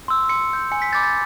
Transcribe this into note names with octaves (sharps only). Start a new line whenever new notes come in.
C6 E6
C6 C#7
E6 G6
G#5 C#7
B6
B5 D6 G6 A6
A6